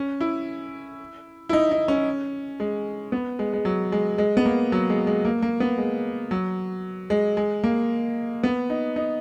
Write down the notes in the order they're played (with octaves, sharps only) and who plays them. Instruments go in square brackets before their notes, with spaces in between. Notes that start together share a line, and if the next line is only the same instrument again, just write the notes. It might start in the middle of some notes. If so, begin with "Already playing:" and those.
Already playing: [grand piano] C#4
E4
E4
D#4
D#4
C#4
G#3
B3
G#3
G#3
F#3
G#3
G#3
B3
A#3
F#3
G#3
G#3
A#3
A#3
B3
G#3
F#3
G#3
G#3
A#3
B3
D#4
D#4